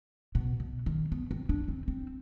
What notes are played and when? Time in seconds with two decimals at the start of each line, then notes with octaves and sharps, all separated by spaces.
0.35 B2
0.60 B2
0.86 D#3
1.12 B3
1.31 C4
1.49 D4
1.68 C4
1.88 C4